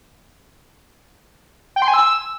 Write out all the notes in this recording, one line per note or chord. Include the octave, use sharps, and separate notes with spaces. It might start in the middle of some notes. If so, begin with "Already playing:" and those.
G5
C6
G#5
E6